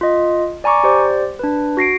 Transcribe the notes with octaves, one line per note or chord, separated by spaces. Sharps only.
F4 D#5
D5 G#5 A#5 C#6 D6
G4 C5 D5
D4 B4
F#4 A#6 C7 D7